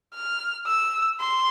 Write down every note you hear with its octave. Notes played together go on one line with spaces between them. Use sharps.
F6
E6
C6